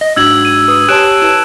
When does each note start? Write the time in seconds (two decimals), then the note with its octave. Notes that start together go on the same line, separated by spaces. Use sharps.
0.01 D#5
0.16 G#2 D4 F#4 E6 G#6 F#7
0.45 D#7
0.68 B4 D#6
0.88 G4 C#5 G#5 A5 C6 F#6 D7 E7
1.22 E4 B4 A5 E7